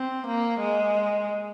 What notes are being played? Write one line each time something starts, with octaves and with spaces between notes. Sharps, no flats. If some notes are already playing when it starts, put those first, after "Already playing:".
Already playing: C4
A#3
G#3